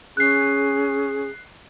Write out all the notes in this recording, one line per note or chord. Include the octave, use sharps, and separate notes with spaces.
C#4 G#4 F#6 C7